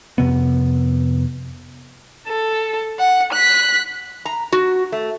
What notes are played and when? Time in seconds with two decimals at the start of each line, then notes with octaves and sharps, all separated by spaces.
0.18 F2 C3 B3
2.28 A4
2.99 F#5
3.33 F#6 B6
4.25 A#5
4.52 F#4
4.92 A3